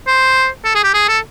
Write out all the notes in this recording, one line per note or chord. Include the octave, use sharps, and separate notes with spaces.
C5
A4
G#4
G4
G#4
A4